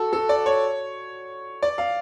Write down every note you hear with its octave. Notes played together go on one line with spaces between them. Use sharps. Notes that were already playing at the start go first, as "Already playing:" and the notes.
Already playing: F#4 A4
A4
D5
C#5
D5
F5